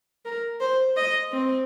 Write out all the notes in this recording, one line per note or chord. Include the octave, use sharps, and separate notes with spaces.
A#4
C5
D#5
C4